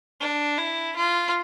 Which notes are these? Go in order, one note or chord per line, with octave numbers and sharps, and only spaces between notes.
D4
E4
F4